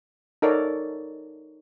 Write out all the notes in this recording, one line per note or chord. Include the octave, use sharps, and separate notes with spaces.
D#4 A4 A#4 C#5 D5